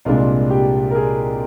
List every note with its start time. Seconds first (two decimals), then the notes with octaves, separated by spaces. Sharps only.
0.05 C2 A#2 G#3 D4 F4
0.50 G4
0.91 A#4
0.95 G#4